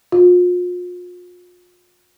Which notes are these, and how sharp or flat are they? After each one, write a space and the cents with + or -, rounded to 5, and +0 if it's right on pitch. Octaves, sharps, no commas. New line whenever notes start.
F4 +40